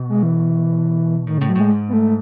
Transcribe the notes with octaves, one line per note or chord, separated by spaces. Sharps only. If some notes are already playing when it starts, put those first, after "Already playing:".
Already playing: B2
G#3
E3
A2 D#3
A2 C#3
F#3
A2 G#3
G#2
B3
A3